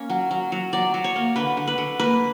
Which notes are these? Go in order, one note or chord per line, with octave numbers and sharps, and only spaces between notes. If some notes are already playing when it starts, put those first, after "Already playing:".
Already playing: A#3 C#4
F#3
F#3
F#3
F#3 D5
F#3
C#5
A#3
D3 B4
D3
B4
D3
A#3 B4